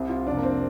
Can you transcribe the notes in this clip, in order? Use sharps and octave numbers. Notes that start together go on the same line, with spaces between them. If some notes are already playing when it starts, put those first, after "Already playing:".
Already playing: C2 C3
F4
F2 C3 D4
A#3
C4